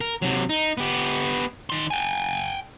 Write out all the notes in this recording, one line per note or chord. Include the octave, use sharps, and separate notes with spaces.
A#4
C3 F#3
D#4
B3 G4
D#3 C6
G5 G#5